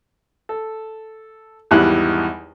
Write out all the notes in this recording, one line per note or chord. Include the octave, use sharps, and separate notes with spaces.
A4
G#1 E2 G3 E4 G4 F#6